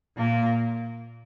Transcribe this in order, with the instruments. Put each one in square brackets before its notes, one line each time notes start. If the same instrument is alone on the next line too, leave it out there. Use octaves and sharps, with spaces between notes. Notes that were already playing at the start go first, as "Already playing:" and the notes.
[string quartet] A#2 A#3